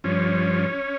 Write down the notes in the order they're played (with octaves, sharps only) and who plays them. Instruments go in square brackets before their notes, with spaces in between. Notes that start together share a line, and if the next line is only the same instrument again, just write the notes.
[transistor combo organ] G2 F3 C#4